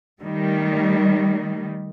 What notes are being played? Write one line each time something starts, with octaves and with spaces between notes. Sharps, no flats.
D#3 G3 A3